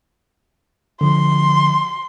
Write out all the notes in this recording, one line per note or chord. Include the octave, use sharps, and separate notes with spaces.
D3 F3 C6